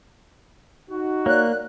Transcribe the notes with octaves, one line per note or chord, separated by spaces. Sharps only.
D#4 F#4
A#3 C#5 D5 F#6